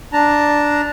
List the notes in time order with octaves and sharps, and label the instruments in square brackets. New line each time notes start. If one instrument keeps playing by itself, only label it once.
[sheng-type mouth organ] D4 A5 A#5